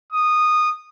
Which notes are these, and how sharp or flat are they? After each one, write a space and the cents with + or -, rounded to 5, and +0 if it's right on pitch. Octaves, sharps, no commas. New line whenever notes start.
D#6 -15